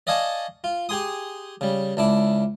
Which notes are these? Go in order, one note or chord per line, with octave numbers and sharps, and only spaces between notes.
D5 D#5 F5 G#5 A5 C#6
F4
G4 G#4 G#5 C6 D#6
C#3 G3
C#2 D4 E4 D6